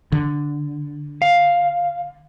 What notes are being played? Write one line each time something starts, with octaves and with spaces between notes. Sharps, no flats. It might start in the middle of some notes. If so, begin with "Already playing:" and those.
D3
F5